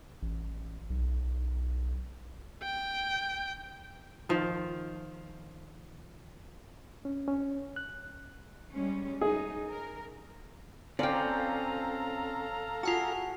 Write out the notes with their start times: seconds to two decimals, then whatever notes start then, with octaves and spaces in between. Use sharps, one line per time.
0.22 A1
0.90 B1
2.63 G5
4.29 D#3 F3
7.05 C#4
7.28 C#4
7.76 F#6
8.70 G3 G#3 C#4
9.21 D#4 G#4
9.68 A#4
10.99 C4 C#4 F4 A4 D5 F5 G5 A#5
12.83 F4 F#4 G#4 F#5 A5